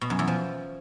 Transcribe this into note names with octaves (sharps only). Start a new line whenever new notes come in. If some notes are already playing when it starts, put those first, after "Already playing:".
B2
F#2
E2
F3